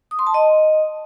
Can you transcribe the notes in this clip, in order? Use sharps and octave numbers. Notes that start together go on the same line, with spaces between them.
D#6
C6
A5
D#5